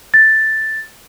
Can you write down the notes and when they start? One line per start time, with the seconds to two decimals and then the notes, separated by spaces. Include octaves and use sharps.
0.14 A6